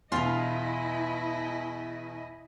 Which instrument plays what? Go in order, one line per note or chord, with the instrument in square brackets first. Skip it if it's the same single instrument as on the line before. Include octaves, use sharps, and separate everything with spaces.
[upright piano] E2 B2 [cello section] E4 D#5 [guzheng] F4 F5